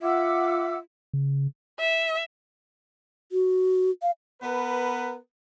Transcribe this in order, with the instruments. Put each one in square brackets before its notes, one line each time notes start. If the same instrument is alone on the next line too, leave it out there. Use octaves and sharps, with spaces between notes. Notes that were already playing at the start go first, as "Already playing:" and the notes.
[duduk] F4 [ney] E5 [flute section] F#5 D6 E6
[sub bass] C#3
[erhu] E5
[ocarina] F#4
F5
[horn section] B3 A#4 B4